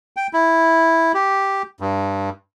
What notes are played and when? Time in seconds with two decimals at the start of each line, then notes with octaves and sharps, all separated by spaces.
0.16 G5
0.33 E4
1.14 G4
1.80 G2